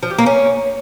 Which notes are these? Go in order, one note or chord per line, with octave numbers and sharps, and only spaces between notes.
F3
G4
A#3
C#4